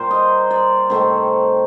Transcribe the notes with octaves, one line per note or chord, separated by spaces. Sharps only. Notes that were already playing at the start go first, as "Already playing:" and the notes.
Already playing: A#2 G3 A#3 A#4 C5
D#5
D5
C3 D#3 A3 C4 C5